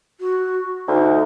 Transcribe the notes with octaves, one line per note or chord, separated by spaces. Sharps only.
F#4
D2 D#4